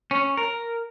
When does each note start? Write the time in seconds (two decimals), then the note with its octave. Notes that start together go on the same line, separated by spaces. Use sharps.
0.11 C#4
0.37 A#4